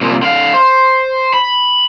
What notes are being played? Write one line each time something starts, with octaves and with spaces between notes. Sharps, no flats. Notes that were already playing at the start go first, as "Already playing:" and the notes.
C2 A#2
D3 F5
C5
B5